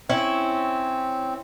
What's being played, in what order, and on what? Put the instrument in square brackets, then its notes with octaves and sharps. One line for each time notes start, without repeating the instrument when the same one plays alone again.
[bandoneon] C4 [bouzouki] C#4 E4